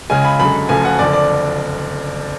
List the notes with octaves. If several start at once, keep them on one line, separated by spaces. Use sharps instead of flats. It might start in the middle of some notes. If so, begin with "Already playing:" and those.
C#2 C#3 G#3 G#5
B5
F#2 D3 G#3 B5
F#1 F#2 F3 A3 G#5
F#5
F#1 F2 D3 D5
D5